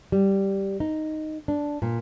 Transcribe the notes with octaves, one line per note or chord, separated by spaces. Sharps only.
G3
D#4
D4
A#2